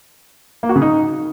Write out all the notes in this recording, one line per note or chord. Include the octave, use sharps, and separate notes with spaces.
A#3
F#4
C#3
D#4